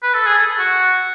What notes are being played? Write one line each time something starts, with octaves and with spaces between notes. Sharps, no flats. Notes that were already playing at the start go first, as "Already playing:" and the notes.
B4
A4
G#4
A4
F#4